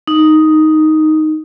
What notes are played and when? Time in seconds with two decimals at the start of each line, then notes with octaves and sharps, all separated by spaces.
0.07 D#4